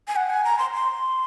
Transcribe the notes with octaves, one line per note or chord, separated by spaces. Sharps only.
G#5
F#5
G#5
A#5
C6
C6